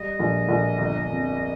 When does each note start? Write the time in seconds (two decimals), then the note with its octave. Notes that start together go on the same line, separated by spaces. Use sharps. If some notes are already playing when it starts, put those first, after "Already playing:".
Already playing: G3 D#5
0.19 A#1
0.48 A#1
0.78 G1
1.08 F2